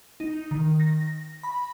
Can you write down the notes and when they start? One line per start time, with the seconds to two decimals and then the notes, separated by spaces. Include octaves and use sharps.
0.20 D#4
0.51 D#3
0.80 A#6
1.43 B5